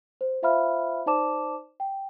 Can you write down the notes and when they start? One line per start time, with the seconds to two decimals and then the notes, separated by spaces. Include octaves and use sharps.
0.21 C5
0.42 F4 C5 E5 F5 B5 F6
1.06 D#4 C5 D5 A5 D6 E7
1.80 G5